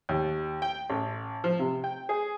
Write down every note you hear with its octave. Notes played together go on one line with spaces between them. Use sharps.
D#2
G5
A1
F3
C3
G5
G#4